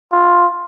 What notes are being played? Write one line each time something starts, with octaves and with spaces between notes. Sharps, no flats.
F4